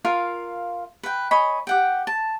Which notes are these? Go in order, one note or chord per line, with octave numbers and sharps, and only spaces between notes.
F4 A#4 F5
B4 G5
C#5 D#5 G#5 B5
G4 F#5 G5
A5